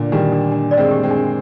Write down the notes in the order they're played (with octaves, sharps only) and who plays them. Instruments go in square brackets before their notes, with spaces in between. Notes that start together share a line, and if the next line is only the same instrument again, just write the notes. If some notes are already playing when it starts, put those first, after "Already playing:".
Already playing: [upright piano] A#2 D3
[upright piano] D#3 G3 [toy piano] D4
[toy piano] D4
D4
D5
[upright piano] G#3 C4
[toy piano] G4
[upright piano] G#3 C4
[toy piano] D4